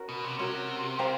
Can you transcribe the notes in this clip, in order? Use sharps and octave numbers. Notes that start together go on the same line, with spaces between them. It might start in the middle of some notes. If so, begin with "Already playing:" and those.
Already playing: C#4 F#4 A#4
B2
C3
C3 C#4 F#4 A#4
G4 C5 F5 A#5